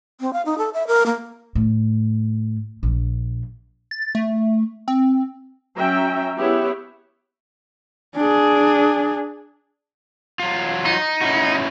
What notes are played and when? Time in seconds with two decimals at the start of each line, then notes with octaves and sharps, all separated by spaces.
0.20 C4
0.33 F5
0.46 D#4
0.58 A4
0.74 E5
0.87 A#4
1.06 A#3
1.55 A2
2.83 A#1
3.91 A6
4.15 A3
4.88 C4
5.76 F#3 C#4 E5 G5 A#5
6.36 B3 E4 G4 G#4 C#5 E5
8.16 D4 G#4
10.40 F#3 F4
10.85 D#4
11.21 C#4 E4 F#4